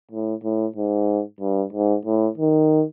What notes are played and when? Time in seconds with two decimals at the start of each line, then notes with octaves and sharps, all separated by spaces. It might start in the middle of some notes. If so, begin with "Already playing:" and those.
0.12 A2
0.44 A2
0.76 G#2
1.40 G2
1.73 G#2
2.05 A2
2.38 D#3